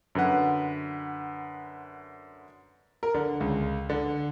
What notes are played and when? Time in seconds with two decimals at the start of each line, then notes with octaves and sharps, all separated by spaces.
0.15 F#2 D3 B4 F#5
3.03 A#4
3.14 D3
3.40 C#2
3.89 D3